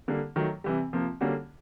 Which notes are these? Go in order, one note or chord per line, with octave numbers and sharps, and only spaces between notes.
D3 G3 A#3
D#3 F#3 A3
C3 E3 G3
C3 F3 A#3
D3 G3 A#3 C#4 F#4